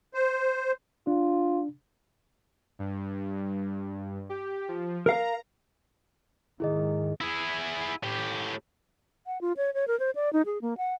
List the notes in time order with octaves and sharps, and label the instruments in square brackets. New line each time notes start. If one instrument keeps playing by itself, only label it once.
[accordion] C5
[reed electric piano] D4 [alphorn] F4
[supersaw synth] G2
G4
F3
[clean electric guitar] A#4 F5 [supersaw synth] A#5
[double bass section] D#2 G#2 D#3 [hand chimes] E4 G#4 D#5
[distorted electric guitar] E4 G#4
A2 G4
[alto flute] F#5
F4
C#5
C#5
A#4
C5
D5
D#4
G#4
A#3
F#5